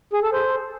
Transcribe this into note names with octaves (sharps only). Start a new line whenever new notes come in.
G#4
A4
C5